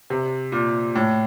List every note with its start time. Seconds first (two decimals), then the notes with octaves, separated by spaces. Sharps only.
0.10 C3
0.52 A#2
0.96 A2